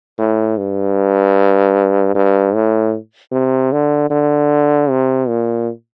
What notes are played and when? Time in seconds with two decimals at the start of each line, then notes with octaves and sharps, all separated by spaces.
0.18 A2
0.57 G2
2.15 G2
2.54 A2
3.32 C3
3.72 D3
4.10 D3
4.89 C3
5.28 A#2